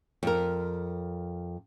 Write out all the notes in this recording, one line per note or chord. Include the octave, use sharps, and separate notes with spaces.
F2 A#4